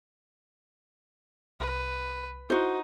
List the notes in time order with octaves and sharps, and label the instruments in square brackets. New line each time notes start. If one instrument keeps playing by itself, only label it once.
[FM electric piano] C2 [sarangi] B4
[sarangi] D#4 [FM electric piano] E4 [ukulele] F#4 C5